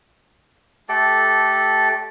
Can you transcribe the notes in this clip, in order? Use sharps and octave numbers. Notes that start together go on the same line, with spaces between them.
A3 G4 A4 D5